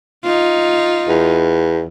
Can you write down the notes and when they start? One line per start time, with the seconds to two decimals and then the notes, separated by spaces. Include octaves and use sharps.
0.24 D#4 F4
1.08 E2